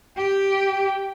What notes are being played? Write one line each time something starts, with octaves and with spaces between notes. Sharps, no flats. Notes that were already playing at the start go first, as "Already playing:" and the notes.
G4 G5